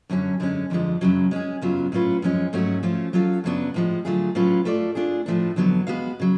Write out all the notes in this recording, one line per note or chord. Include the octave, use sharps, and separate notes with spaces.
F#2 D3 F#3 C#4
F#2 D3 G#3 C#4
F2 D3 F3 G#3
F#2 C#3 F#3
G#3 C#4 G#4
F#2 C#3 F#3 B3 F4
A2 F#3 C#4 F4 B4
F#2 F3 G#3 C#4
G#2 F#3 A3 C#4 F#4
F3 A3 C#4 F4
F#3 C#4 F4 A4 F5
F#2 C#3 F#3 B3 D4
A2 F3 G#3
D3 F#3 A3 F4 G#4
A2 F#3 C#4 F4 B4
A3 F4 A4 D5
A3 D4 F4 G#4
A2 F3 A3 D4
F2 D3 F#3 B3
G#3 B3 F#4 B4 F5
C#3 F#3